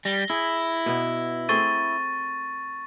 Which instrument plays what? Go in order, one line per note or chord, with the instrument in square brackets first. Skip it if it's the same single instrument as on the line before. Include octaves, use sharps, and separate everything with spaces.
[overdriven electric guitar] G3 [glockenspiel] A#6 G7
[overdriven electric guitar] E4 [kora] G#4
[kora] B2 B3
[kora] A3 C4 G#4 [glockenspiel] C#6 A6 D#7